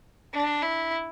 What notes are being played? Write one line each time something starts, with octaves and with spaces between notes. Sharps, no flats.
D4
E4